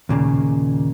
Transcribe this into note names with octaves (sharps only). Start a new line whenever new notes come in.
D#2 A#2 C#3